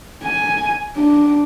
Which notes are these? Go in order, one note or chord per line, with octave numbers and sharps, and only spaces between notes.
G#5
D4